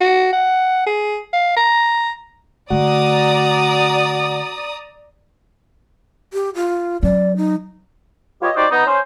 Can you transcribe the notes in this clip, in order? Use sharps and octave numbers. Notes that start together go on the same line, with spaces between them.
F#4
F#5
G#4
F5
A#5
D3 A3 F#4 D5 A#5 D#6
G4
F4
F#3 C#4 D5
D#4
F4 G4 B4 C#5 D#5
D#4 F#4 G4 C5 D5
B3 D#4
C#4 C5